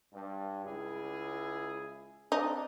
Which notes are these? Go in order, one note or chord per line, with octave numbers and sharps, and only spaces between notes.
G2
C#2 E4 G#4
C4 D4 D#4